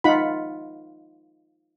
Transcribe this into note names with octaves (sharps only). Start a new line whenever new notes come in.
D#4 F4 F#5 B5